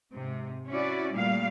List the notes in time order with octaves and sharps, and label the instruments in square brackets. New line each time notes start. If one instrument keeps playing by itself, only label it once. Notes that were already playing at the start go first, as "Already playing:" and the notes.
[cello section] G#2 C3
C#4 E4 F#4 D5
A#2 G3 A3 F5